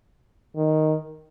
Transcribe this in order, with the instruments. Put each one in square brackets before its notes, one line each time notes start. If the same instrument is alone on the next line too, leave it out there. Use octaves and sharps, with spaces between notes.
[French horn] D#3